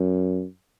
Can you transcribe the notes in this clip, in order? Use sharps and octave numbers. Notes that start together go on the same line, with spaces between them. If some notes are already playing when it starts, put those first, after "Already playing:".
Already playing: F#2